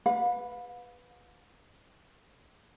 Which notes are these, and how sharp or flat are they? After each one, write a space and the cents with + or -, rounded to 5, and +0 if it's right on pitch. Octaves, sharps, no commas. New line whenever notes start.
B4 +0 F5 +45